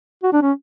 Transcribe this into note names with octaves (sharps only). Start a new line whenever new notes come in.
F#4
D4
C#4